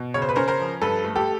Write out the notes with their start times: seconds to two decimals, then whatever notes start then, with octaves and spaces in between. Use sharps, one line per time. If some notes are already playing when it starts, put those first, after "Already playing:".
Already playing: B2
0.14 C#3 C#5
0.22 C5
0.29 B4
0.36 C#4 A#4 C5
0.48 A#4 C5
0.59 F3
0.81 G2 A4 B4
1.04 A3
1.16 G4 A4